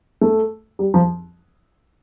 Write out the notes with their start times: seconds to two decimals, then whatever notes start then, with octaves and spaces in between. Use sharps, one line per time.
0.21 A3
0.79 G3
0.94 F3